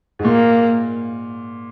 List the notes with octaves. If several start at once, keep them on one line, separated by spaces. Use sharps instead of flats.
G#2
A#2 A#3